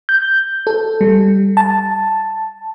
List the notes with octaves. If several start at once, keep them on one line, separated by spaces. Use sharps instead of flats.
G6
A4
G3
A5